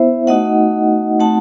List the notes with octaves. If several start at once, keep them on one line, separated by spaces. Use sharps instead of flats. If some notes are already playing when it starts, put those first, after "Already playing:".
Already playing: B3 E4 C5 E5
A3 D#4 F#4 D#5 F#5
A3 C4 D#4 F#4 F#5 A5